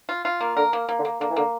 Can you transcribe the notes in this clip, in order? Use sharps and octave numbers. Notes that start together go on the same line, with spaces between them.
F4
F4
A#3
D3 A#4
A#3
A#3
D3
A#3
D3 A#3
E3
D3 A#3